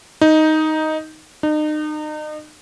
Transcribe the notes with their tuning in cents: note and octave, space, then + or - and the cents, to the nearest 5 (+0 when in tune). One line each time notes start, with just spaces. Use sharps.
D#4 +5
D#4 -35